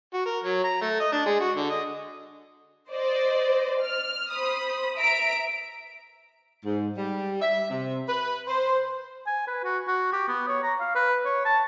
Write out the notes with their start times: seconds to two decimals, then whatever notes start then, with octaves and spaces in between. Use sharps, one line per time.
0.14 F#4
0.25 A#4
0.43 F#3
0.64 A#5
0.81 A3
1.00 D#5
1.12 D4
1.26 G#3
1.40 F#4
1.56 D3
1.70 D#5
2.91 C5 D5 D#5
3.80 F6
4.30 C5 B5 D#6
4.96 E5 A#5 B6 D7
6.65 G#2
6.97 G3
7.42 E5
7.71 C3
8.08 B4
8.48 C5
9.26 G#5
9.47 B4
9.64 F#4
9.88 F#4
10.13 G4
10.28 B3
10.48 C#5
10.63 A#5
10.80 F5
10.95 B4
11.25 C#5
11.45 A5